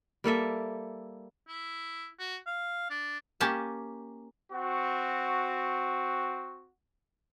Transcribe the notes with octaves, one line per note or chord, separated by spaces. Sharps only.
G3 A#3 A4 E5
E4
F#4
F5
D4
A#3 C#4 G4 A5
C4 F#4